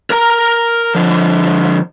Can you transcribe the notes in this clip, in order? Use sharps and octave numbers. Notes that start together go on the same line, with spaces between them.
A#4 A#5
D3 F3